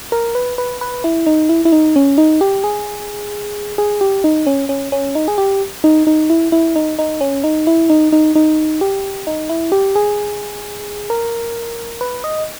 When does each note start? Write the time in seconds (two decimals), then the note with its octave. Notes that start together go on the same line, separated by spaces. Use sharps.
0.12 A#4
0.35 B4
0.58 B4
0.81 B4
1.04 E4
1.27 D#4
1.49 E4
1.65 E4
1.72 D#4
1.96 C#4
2.18 D#4
2.41 G4
2.64 G#4
3.78 G#4
4.01 G4
4.24 D#4
4.47 C#4
4.69 C#4
4.92 C#4
5.15 D#4
5.28 G#4
5.38 G4
5.84 D#4
6.07 D#4
6.30 E4
6.52 E4
6.76 D#4
6.99 D#4
7.21 C#4
7.44 D#4
7.67 E4
7.90 D#4
8.12 D#4
8.35 D#4
8.81 G4
9.27 D#4
9.50 E4
9.72 G4
9.96 G#4
11.10 A#4
12.01 B4
12.24 D#5